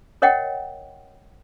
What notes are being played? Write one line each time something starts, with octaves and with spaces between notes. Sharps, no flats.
A#4 C#5 D#5 F#5 G5